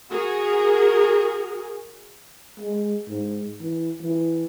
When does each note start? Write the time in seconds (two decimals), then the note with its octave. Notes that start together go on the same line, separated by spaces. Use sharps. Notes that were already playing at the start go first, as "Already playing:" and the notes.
0.11 F#4 G#4 A#4
2.60 G#3
3.09 G#2
3.62 E3
4.02 E3